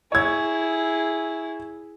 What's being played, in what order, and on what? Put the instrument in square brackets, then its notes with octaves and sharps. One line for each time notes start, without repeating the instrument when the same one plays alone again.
[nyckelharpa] E4 G#4 [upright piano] C#5 G#6